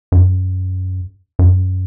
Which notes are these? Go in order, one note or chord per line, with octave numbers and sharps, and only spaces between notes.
F#2
F#2